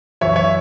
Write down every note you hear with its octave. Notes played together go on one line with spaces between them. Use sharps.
F#2 E3 C#5 E5
C#5 E5